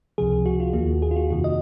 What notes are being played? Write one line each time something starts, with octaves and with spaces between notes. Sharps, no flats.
C#2 C3 F3 G#4
F#4
F4
D#2 D#3 A#3 F#4
G#4
F4
F#4
F2 C3 D#3 F#4
D#5